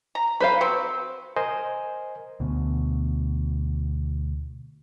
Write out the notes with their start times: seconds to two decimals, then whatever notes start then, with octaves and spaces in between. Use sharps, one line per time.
0.15 A#5
0.40 B4 C5 F5 B5
0.61 F#3 C4 F#4
1.36 A#4 C5 D#5 G#5
2.40 D2 B2